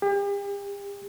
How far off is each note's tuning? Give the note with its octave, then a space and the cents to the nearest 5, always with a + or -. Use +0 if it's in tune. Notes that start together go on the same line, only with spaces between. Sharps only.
G4 +40